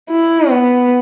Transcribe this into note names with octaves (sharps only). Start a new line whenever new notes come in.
E4
B3